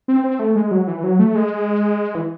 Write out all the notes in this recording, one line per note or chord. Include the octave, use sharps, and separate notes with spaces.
C4
C4
A3
G#3
F#3
E3
F#3
A3
G#3
E3